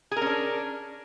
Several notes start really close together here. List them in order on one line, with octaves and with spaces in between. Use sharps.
G#4 A#4 C#4 D4